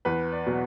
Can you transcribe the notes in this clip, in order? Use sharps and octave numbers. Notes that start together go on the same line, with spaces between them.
E2 B4
D5
B2 F#3 B3